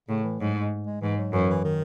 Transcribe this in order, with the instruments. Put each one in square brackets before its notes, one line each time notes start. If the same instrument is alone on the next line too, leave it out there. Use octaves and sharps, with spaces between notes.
[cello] A2 [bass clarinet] C#3
[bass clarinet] E3
[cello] G#2 [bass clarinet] F#3
[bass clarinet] G#3
G#3
[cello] G#2 [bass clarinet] E3
[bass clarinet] F#3
[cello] F#2 [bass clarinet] E3
[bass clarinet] E3
D#3